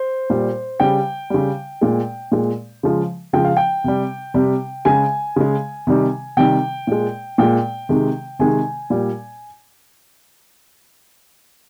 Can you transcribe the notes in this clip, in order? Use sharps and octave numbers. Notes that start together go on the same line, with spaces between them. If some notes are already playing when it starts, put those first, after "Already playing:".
Already playing: C5
A#2 G3
C#3 G3 G5
C#3 G3
A#2 G#3
A#2 G#3
C#3 F3 G#3
C#3 F3 G#3 G5
F5
G5
C3 G3
C3 G3
C#3 G#3 G#5
C#3 G#3
C3 D#3 G3
C3 D#3 G3 G5
A#2 G#3
A#2 G#3 G5
C3 D#3 G#3
C3 D#3 G#3 G#5
A#2 G3